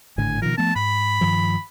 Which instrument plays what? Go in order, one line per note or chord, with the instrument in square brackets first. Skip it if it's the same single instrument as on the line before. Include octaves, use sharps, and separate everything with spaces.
[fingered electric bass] G#1 A2 D3 [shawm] G#5
[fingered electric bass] B2 D#3 F3 [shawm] A#4
[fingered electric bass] F3 A3 B3 [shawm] A5
[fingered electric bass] G#2 [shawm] B5
[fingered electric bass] G2 D#3 F3